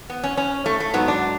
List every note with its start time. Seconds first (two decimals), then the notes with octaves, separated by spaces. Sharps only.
0.10 B3
0.24 C#4
0.37 C#4
0.66 A3
0.80 A3
0.94 G#2 F#3 B3
1.08 D4